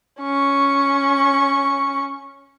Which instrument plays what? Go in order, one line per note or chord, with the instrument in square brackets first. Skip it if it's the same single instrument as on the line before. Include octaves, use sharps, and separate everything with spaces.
[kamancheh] C#4 C#6